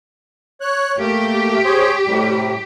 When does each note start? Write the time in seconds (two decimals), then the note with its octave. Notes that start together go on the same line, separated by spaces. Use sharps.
0.61 C#5 F#6
0.98 A3 A#3 G4
1.65 G#4 C5 C#5
2.06 A2 C3 G3